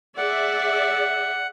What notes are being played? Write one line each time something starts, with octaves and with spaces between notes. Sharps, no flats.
G#4 D5 E5 F#5